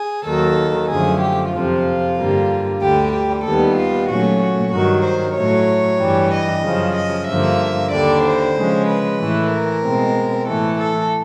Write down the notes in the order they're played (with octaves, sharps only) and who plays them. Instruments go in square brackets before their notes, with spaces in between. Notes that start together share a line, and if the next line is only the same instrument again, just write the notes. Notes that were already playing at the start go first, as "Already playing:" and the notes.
Already playing: [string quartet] G#4
D#2 D#3 F#3 A4
F#2 D3 F3 A3 G#4
G4
F2 C3 F3 F4
G2 D3 G3 A#3
D2 D3 G3 G4
G4
D#2 D#3 G3 B3 A4
F4
A#2 F#3 A3 C#4 F#4
F#4
G2 D#3 F#3 F#4
C5
A2 F#3 A3 C#5
G2 E3 G3
D#5
F#2 C#3 F3
D#5
G2 D3 F3 A#3 E5
D#2 D3 G3 D5
C5
C#3 F3 G#3 C#4
B4
A2 E3 A3
A#4
B2 G#3 C4
A2 E3 A3 A4
A4